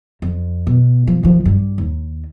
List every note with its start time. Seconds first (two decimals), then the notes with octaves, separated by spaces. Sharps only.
0.22 F2
0.67 B2
1.07 F3
1.23 D#3 F3
1.45 G2
1.78 D#2